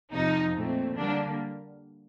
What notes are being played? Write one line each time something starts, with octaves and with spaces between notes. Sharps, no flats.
F2 C3 F3 D#4
A#2 A3 C4
D3 G3 A#3 D4